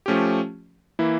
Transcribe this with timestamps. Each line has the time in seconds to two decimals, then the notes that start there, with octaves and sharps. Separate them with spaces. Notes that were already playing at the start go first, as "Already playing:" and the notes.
0.06 F3 A3 C#4 G4
0.99 E3 A#3 E4